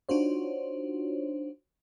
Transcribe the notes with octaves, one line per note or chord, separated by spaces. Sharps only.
D4 D#4 F4 F#4 C5 C#5